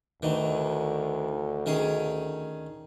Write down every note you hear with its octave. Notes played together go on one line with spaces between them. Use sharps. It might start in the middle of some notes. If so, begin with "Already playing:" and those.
D2 D#3 E3
D#3 C#4 G#4